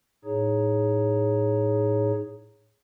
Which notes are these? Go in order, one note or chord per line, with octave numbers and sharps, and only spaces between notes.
A2 D#4 G#4 C#5